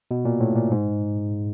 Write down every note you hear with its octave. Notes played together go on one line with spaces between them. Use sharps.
B2
A#2
A2
A#2
G#2